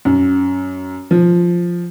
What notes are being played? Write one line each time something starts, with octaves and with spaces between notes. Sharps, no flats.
F#2
F3